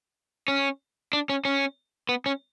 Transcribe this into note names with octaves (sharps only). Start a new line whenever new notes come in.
C#4
D4
C#4
C#4
B3
C#4